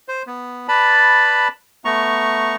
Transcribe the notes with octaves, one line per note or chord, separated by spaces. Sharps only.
C5
B3
B4 D5 A5 B5
A3 B3 A#5 C#6